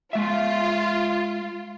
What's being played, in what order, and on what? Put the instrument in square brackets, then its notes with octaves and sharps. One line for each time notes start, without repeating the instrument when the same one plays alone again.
[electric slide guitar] G#3 E5 [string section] F4